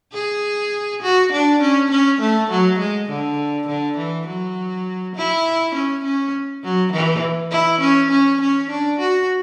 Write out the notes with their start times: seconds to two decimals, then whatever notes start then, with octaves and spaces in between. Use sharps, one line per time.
0.14 G#4
1.02 F#4
1.32 D4
1.61 C#4
1.91 C#4
2.21 A3
2.50 F#3
2.79 G#3
3.09 D3
3.68 D3
3.97 E3
4.27 F#3
5.16 E4
5.75 C#4
6.04 C#4
6.64 F#3
6.92 E3
7.51 E4
7.81 C#4
8.10 C#4
8.41 C#4
8.70 D4
8.99 F#4